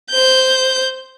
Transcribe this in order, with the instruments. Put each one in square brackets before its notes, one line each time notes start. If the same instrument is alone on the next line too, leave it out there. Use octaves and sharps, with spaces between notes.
[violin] C5 G6